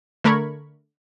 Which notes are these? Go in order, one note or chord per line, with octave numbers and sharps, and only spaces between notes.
D3 A3 A#4 B5 C#6 G#6